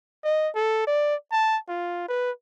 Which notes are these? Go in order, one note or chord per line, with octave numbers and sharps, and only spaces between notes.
D#5
A4
D5
A5
F4
B4